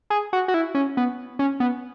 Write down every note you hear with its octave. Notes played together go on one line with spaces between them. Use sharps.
G#4
F#4
F#4
E4
C#4
B3
C#4
B3